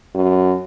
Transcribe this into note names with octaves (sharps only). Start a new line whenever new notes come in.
F#2